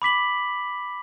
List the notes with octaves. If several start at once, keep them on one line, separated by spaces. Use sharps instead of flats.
B5 D6 B6 F#7